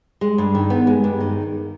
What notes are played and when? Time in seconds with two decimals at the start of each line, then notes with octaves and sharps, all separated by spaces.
0.21 G#3
0.38 G2
0.55 D#3
0.70 B3
0.87 G#3
1.04 G2
1.20 D#3